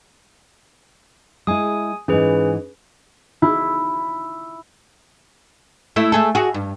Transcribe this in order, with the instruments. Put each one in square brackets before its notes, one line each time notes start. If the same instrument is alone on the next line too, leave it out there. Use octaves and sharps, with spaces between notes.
[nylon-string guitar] G#3 E4 [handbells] G#5 D#6
[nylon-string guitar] G#2 E3 [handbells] C#4 G#4 B4
[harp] E4
[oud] A3 E4
A3 G#4 A4
F#4 G#4
G2